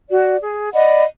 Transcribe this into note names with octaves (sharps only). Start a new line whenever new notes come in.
F#4 D5
G#4
D5 D#5 F#5 B5